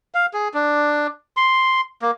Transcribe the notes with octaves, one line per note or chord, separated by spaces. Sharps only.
F5
G#4
D4
C6
A#3